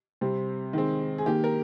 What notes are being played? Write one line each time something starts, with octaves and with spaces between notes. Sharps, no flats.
C3 G3 C4
D#3 G#3 C4
G#4
D#3 A#3 G4
A#4